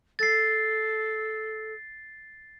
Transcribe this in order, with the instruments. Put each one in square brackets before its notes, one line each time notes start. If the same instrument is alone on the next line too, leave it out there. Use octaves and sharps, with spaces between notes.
[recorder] A4 [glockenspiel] A6 C7